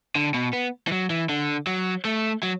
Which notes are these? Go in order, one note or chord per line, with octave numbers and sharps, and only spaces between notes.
D3
B2
B3
E3
F#3
E3
D3
F#3
A3
F#3